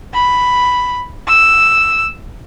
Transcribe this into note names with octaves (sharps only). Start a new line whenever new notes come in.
B5
E6